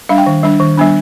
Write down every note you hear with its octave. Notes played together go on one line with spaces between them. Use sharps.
G3 D4 F5
G5
D#3
G3 D4
D#3
G3 B3 D4